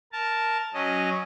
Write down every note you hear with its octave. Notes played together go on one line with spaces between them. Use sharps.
A#4 A5
F#3 C#4 D#5